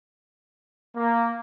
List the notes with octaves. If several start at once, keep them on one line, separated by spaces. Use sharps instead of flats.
A#3